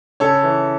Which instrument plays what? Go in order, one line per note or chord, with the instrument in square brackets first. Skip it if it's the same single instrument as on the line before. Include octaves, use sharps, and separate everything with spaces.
[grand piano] C#3 A4 C#5
E3